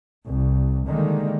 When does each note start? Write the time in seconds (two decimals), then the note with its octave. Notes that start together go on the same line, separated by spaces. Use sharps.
0.24 C2
0.88 D3 D#3 G3 G#3 A#3